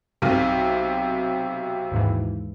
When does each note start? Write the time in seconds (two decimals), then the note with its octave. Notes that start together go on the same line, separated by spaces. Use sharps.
0.22 B1 C3
1.92 D#2 G#2 E3